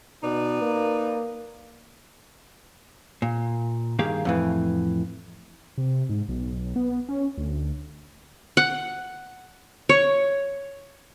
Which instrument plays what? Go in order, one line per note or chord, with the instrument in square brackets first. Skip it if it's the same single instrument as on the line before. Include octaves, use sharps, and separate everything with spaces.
[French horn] B2 [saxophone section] D#4 B4 D5
[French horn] A#3
[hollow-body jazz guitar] A#2
G2 D#3 A#3 G4 G#4 F5
F2 A2 E3
[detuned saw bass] C3
G#2
B1
B3
C#4
D2
[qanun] F#5
C#5